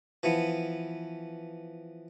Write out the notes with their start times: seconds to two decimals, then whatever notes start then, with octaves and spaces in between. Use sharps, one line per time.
0.23 E3 F3 B3